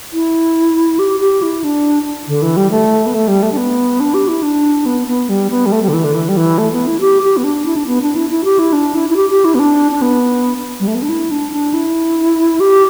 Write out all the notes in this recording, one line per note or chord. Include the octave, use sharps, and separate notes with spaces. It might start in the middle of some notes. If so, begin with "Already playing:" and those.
E4
G4
G4
E4
D4
D3
E3
G3
A3
B3
A3
G3
A3
D4
B3
D4
G4
E4
D4
B3
B3
G3
B3
G3
A3
G3
D3
E3
D3
E3
G3
E3
A3
B3
E4
G4
G4
B3
D4
E4
D4
B3
D4
E4
E4
G4
E4
D4
E4
E4
G4
G4
E4
B3
D4
D4
B3
G3
A3
B3
D4
E4
D4
D4
E4
G4